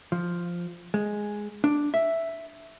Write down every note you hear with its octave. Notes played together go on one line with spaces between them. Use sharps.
F3
G#3
D4
E5